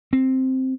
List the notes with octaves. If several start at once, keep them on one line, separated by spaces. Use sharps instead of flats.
C4